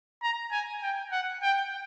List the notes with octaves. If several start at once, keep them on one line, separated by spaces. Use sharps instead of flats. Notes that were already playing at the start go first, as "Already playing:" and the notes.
A#5
G#5
G5
F#5
G5